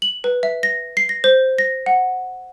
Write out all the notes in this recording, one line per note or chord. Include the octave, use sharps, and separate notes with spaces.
F#7
B4
E5
A#6
C7
A#6
C5
A#6
F#5